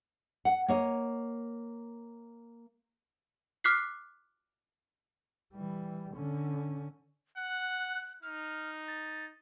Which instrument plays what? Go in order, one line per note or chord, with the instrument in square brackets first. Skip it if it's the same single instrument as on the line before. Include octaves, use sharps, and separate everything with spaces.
[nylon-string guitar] F#5
A#3 C#5 D#5
[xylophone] D6 F6 F#6 B6 C7
[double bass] E3 G3
D3 C#4
[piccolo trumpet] F#5 [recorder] F#6
[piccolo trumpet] D#4 [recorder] F6
[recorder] A6